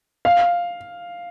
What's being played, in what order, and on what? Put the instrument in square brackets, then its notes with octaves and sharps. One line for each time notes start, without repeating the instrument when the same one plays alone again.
[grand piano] F5